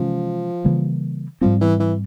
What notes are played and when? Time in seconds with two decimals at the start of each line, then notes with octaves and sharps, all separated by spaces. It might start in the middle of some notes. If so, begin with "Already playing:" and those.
Already playing: C3 E3 F3 G#3 C#4
0.64 C#3 E3 G3 A#3
1.41 G#2 F3 G3 C4
1.61 E3
1.79 E3